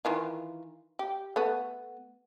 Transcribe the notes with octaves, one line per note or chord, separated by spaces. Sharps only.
D#3 E3 F4
G4
A3 B3